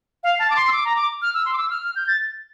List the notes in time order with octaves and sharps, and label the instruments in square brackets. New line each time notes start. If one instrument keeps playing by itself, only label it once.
[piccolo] F5
A5
D6
C6
E6
D6
A#5
D6
F6
E6
C6
D6
E6
F6
F6
G6
A6